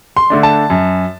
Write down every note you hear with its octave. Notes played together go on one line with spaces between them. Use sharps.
C6
D3 A3 D4
A5
F#2